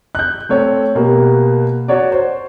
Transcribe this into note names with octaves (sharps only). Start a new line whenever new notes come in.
F#6 G6
A3 C4 C#5
B2 A#3 G4
F#4 C#5 D5
C5